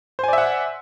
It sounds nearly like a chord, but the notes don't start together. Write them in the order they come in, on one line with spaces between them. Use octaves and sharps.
C5 G#5 D5 E5 F#5